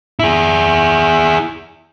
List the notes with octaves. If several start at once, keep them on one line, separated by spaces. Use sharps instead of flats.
E4 G#4